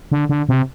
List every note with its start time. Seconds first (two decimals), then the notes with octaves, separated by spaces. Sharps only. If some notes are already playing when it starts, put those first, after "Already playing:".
0.12 D3
0.29 D3
0.49 C3